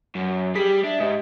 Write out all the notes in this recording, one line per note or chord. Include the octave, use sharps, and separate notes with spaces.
F#2
G3 G4 G#4 B6
D4 E5
G#2 G4 D#5